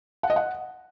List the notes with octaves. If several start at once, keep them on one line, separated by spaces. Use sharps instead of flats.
F#5
D#5
F#5